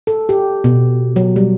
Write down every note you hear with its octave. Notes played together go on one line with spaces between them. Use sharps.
A4
G4
B2
F#3
G3